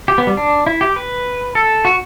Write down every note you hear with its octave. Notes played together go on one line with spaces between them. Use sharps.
G4
B3
G3
D4
E4
G4
B4
A4
F#4